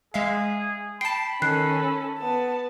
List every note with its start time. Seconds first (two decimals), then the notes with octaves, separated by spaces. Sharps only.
0.14 G#3 G#4 E5 F5
1.01 G5 A5 B5 C7
1.42 D#3 C#4 A4 F#6 C7
2.19 B3 A5